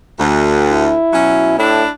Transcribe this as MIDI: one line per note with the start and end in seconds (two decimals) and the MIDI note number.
0.20 0.94 38
0.72 1.57 64
1.13 1.56 47
1.13 1.56 54
1.13 1.56 61
1.59 1.83 45
1.59 1.88 62
1.59 1.88 64